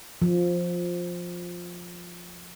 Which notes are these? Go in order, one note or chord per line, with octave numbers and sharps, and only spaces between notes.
F3